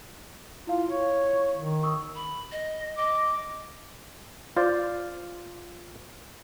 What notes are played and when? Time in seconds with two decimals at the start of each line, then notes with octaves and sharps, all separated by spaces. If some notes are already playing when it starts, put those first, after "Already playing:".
0.67 E4 F4 F5
0.90 C#5
1.55 D#3
1.83 C#6 D#6 E6
2.15 B5
2.52 D#5
2.97 D#5 D6
4.57 F4 C5 D5